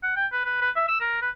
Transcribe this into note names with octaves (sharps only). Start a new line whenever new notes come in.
F#5
G5
B4
B4
B4
E5
E6
A#4
B4